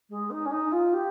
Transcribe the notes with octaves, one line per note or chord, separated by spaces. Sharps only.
G#3
D#4
C#4
D#4
F4
G4